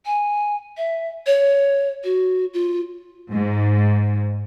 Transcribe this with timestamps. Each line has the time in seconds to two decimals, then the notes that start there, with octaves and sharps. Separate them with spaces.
0.06 G#5
0.77 E5
1.27 C#5
2.04 F#4
2.54 F4
3.33 G#2